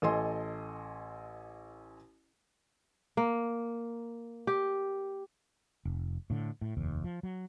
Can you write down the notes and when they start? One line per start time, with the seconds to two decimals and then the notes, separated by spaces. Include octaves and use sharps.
0.02 A1 A4 D#5 G#5 C6
3.17 A#3
4.47 G4
5.85 F1
6.30 A2 D3
6.61 A2
6.77 F1 D#2
7.04 F3
7.23 F#3